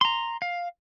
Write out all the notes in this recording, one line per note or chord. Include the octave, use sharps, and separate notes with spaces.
A#5 C6
F5